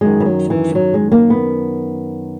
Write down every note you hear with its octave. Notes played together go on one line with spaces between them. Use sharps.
F#2 D#3 G#3
E3
F#3
E3
F#3
G#3
A#3
B3